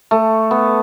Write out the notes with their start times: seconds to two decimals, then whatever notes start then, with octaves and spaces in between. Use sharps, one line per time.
0.11 A3
0.51 B3